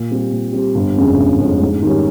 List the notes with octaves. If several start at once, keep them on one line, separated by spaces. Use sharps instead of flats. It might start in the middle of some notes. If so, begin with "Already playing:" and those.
Already playing: A#2
G3 C4 G4
A#2
G3 C4 G4
G1
F2 C#3 G#3 C#4
G1
F2 C#3 G#3 C#4
G#2
D#3 G3 C#4